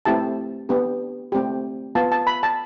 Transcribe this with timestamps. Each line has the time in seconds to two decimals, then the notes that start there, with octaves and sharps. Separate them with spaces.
0.05 A3 C4 E4 G4 A5
0.69 B3 D4 G4
1.32 A3 C4 G4
1.95 B3 F4 A5
2.12 A5
2.27 B5
2.43 A5